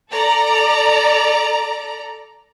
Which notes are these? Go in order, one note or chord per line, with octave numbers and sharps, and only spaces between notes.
A4 D5 A#5